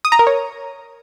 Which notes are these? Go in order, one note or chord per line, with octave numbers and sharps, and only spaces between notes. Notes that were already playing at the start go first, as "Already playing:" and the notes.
D#6
A#5
A#4
C#5